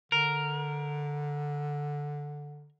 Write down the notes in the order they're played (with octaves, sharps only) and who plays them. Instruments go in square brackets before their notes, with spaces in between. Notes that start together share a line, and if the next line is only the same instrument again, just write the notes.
[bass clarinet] D3 [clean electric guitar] A#4